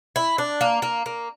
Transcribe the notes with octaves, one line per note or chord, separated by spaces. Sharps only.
E4
D4
A#3
A#3
A#3